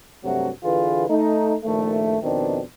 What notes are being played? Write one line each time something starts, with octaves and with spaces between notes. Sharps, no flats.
G2 C3 F#3 A3 F#4
D3 E3 F4 G#4 B4
A3 D#4
A#1 D#3 A3
F2 B2 D#3 C4 D4